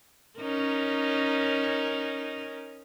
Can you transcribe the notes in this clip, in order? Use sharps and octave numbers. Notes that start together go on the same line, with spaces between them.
C#4 D#4 A#4